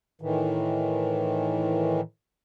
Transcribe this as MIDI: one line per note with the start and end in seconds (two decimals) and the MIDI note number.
0.21 2.01 45
0.21 2.01 51
0.21 2.01 52